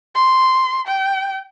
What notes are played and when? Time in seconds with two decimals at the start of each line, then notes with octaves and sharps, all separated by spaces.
0.15 C6
0.87 G5